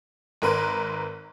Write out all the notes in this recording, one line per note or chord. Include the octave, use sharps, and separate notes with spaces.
G#1 A#4 B4 C6